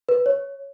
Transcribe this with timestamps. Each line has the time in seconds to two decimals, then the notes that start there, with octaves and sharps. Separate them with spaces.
0.09 B4
0.26 C#5